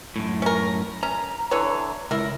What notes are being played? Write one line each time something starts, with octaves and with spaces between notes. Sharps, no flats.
F#2 A2
C#4 A#4
C#4 A#5
D3 E3 C#5
C#2 E4 A#4